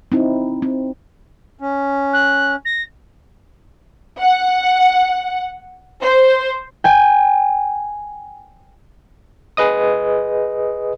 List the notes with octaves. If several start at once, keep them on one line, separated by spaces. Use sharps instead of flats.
C4 D#4 E4
C4
C#4
F#6
A#6
F#5
C5
G5 G#5
G#4 B4 D#5 D#6